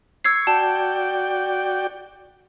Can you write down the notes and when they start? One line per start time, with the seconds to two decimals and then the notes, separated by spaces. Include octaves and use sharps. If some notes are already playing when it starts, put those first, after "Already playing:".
0.25 C#6 E6 G#6 C7
0.47 F#4 D5 G5 A5